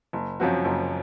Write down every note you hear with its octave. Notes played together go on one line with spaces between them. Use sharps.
F#1
F#2 F3 C4 F#4
F#1